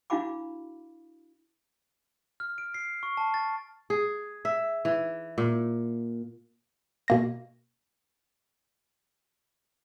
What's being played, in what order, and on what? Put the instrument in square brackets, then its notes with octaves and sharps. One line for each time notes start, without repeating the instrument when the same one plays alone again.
[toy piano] D4 E4 F#4 F5 B5 D6
[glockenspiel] F6
D7
C7
C#6
A5
A6
[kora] G#4
E5
E3
A#2
[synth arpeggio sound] B2 A#3 A#6